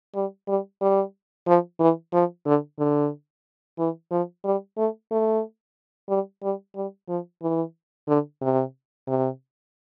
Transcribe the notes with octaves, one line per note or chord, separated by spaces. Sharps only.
G3
G3
G3
F3
E3
F3
D3
D3
E3
F3
G3
A3
A3
G3
G3
G3
F3
E3
D3
C3
C3